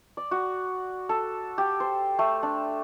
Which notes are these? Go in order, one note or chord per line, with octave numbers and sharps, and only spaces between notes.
D5
F#4
A4
G4
C5
A3
D4